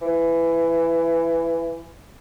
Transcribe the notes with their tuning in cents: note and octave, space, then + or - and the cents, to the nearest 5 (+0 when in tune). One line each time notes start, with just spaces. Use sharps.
E3 +15